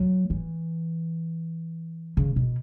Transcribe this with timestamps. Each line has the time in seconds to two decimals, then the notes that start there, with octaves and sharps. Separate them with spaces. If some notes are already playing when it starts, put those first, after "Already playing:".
Already playing: F#3
0.30 E3
2.17 C#3
2.36 B2